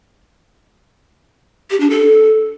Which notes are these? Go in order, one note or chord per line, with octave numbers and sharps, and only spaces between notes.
G4
D4
A4